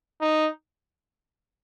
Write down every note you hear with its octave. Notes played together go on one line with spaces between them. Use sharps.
D#4